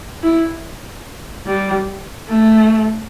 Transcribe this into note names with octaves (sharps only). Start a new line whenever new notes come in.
E4
G3
A3